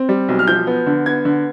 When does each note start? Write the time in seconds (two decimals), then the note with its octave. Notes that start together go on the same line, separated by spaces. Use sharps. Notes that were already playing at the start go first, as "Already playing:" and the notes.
Already playing: C4
0.09 G3
0.28 B1
0.39 F6
0.47 F3 G6
0.67 B3
0.86 D3
1.06 B3 G#6
1.25 D3